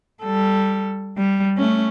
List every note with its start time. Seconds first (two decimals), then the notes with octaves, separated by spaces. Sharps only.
0.22 G3 A4
1.17 G3
1.57 A3 C#4